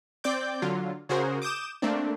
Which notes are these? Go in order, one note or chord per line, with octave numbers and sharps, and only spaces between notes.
C4 D5 G5 D6 G6
D3 F#3 F4
C#3 F#4 G#4 A#4 C5
D6 D#6 G6 E7
A3 A#3 C4 D4